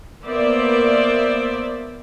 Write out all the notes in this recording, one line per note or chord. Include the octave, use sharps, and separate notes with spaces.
A#3 B3 C5 D5 E5